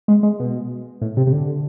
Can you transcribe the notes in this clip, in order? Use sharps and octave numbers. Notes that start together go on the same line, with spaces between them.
G#3
G#3
B2
A2
C3
C3
D3